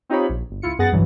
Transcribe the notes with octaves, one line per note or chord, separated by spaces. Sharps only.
C4 D#4 F4 G4 C#5 B5
A#1
G1
C#2 E4 F4 C#7
F#2 B3 G#4 F#5 A6 A#6
G1 C#2 G2 C#3 E3 F#3